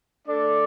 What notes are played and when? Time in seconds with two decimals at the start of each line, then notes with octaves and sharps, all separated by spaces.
0.28 A3 D4 A4 D5